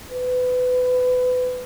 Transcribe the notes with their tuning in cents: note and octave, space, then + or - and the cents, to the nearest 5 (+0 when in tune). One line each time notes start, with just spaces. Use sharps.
B4 +25